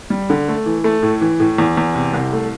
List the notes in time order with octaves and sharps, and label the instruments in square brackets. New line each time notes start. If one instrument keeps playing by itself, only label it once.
[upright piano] G3
D3
A3
E3
A3
A2
E3
A2
E2
E2
C3
C2
A3